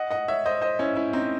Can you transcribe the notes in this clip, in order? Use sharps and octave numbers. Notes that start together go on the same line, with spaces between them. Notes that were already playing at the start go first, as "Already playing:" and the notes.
Already playing: D#5 F#5
D#5 F#5
C#5 E5
C5 D#5
C5 D#5
C#4 E4
C#4 E4
C4 D#4